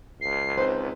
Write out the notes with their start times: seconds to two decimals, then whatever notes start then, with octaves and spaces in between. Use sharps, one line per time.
0.21 C#2 C7
0.58 C4 D#4 B4 C5